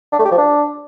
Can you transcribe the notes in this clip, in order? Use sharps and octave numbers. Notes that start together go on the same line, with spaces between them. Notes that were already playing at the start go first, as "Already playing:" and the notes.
D4
A3
G4
F3
D4